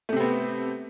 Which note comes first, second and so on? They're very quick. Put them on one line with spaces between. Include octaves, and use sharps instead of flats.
A3 C3 C4 B3